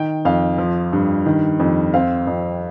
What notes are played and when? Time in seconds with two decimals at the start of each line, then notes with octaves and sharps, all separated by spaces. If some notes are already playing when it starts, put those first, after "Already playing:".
Already playing: D#3 G5
0.25 F2 F5
0.58 F3
0.93 G2
1.26 D#3
1.60 F2
1.94 C4 F5
2.27 F2